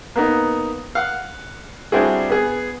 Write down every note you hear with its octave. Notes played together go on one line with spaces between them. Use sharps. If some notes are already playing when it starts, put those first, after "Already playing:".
A#3 B3 D#4
F5 F#5
G3 C4 D4 E4 F#4 G#4
B3 G#4